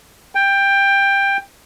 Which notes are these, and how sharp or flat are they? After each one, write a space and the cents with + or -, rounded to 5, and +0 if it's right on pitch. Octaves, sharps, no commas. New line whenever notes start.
G5 +15